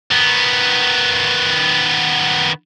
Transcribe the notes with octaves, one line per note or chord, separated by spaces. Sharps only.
D#3 B3